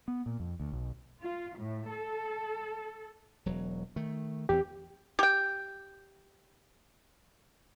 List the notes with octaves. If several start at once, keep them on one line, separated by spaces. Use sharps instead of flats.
B3
A#2
F2
D2
B1
F4
A2
A4
E1 F#3
D#3 A3
E2 E3 C4 G4
G4 G5